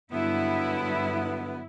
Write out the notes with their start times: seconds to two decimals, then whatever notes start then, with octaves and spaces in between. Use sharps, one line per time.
0.11 G2 D3 F#3 B3 E4